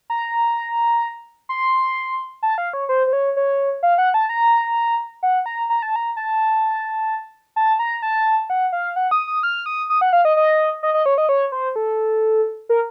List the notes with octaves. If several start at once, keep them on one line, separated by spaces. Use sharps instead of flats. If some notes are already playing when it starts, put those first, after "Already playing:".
A#5
C6
A5
F5
C#5
C5
C5
C#5
C#5
F5
F#5
A5
A#5
F#5
A#5
A#5
A5
A#5
A5
A5
A#5
A5
F#5
F5
F#5
D#6
D#6
F6
D#6
D#6
F#5
F5
D#5
D#5
D#5
D#5
C#5
D#5
C#5
C5
A4
A#4